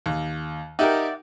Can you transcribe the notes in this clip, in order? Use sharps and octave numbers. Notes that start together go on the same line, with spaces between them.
D#2
D#4 G4 A#4 D5 E5 F#5